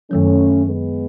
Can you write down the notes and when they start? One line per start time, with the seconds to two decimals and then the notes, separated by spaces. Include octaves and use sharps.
0.11 F#2 D#3 F#3 A3 C#4
0.66 G#3 B3